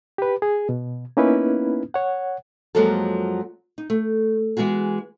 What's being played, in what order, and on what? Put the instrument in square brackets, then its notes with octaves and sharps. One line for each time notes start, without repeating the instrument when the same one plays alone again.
[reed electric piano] G4 B4
G#4
B2
A#3 B3 C#4 D#4 E4 B4
C#5 F#5
[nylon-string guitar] F#2 F3 F#3 G#3 A#3 A4
D#4
A3
E3 G#3 B3 F#4 G#4